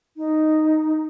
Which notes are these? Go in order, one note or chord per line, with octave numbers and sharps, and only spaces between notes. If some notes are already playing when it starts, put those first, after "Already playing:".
D#4